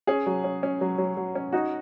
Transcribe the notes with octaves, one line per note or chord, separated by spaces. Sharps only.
C#4 G#4
F#3
C#4
C#4
F#3
F#3
F#3
C#4
D#4 F#4